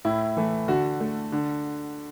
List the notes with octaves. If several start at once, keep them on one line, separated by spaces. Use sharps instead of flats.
A2 E4
E3 A3
D3 F#4
A3
D3